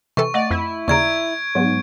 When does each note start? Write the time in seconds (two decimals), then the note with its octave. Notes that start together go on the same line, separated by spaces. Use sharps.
0.17 C3 E3 A4 C#6
0.34 A3 D5 D#5 F#5
0.51 F2 E4
0.88 D#2 C#3 D5 A#5 C#6 G#6 D7
1.55 G#2 F#3 B3